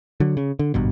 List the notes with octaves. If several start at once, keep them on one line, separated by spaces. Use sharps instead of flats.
D3 F#3
C#3
D3
G#1 G2 B2